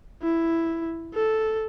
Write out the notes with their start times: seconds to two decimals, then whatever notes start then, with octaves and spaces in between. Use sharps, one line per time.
0.22 E4
1.15 A4